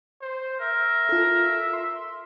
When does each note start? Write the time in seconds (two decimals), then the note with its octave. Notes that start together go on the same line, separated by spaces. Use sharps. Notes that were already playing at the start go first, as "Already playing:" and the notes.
0.21 C5
0.60 A#4 E5
1.09 F4 A4
1.73 C6